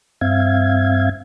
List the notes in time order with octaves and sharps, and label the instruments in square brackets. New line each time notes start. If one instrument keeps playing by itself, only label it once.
[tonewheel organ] G2 C4 E5 F5 G#6